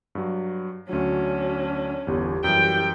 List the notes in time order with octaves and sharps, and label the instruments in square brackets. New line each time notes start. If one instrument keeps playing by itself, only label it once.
[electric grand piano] G2 F#3
[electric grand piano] D2 F#3 [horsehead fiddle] C#4 D4 [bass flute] F#4
[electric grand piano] G1 E2 [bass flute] G4
[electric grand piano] F#2 E3 G3 [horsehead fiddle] G5